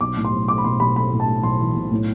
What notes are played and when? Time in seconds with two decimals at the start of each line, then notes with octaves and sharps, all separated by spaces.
0.01 B1 D6
0.17 A2
0.25 C6
0.33 B1
0.48 A3 D6
0.58 B5
0.64 B1 C6
0.80 B1 B5
0.96 A3 B5
1.12 A2
1.20 A5
1.28 A3
1.43 B1 C6
1.60 E3
1.75 B1
1.91 A2